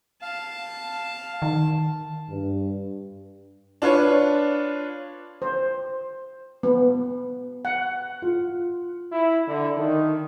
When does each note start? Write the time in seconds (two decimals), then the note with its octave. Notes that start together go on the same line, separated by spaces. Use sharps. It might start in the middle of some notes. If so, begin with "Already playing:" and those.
0.22 F5 A5
1.42 D#3
2.29 G2
3.82 D4 F4 B4 C#5
5.42 C5
6.63 B3
7.65 F#5
8.22 F4
9.12 E4
9.47 D3
9.77 D#3